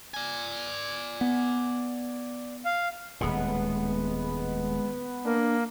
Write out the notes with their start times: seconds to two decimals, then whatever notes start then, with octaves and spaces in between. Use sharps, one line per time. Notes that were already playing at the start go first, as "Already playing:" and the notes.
0.14 D5 G#5
1.21 B3
2.65 F5
3.21 D#1 A2 G#3 B3
5.25 A#3 D4